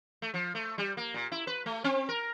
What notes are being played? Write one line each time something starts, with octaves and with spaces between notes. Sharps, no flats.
A3
F3
A3
G3
A#3
A#2
E4
B4
A3
C4
A#4